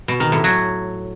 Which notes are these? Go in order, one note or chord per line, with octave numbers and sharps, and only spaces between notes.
B2
D#3
A2
F#3